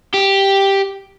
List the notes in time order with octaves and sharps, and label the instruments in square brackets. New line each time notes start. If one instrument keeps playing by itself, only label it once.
[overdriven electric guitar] G4